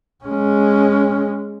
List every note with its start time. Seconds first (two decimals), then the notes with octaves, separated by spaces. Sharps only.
0.25 G#3 C#4